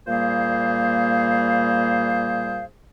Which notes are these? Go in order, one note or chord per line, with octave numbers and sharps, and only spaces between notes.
A#2 G3 A#3 G#4 C5 F5